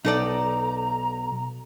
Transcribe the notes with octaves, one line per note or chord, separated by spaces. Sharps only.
B1 D#4 A4 D5 A#5